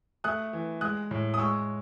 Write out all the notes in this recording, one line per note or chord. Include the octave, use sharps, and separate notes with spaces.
A3 D#6 F#6
E3
G#3 D#6 F#6
A2
D#6
G#3 C#6 E6